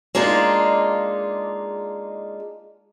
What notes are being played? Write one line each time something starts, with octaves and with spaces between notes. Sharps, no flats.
G#3 A#3 D4 D#4 F4